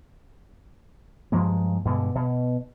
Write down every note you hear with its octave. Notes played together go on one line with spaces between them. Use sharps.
G2 F3 G#3 A#3
G2 B2 D3 G#3
B2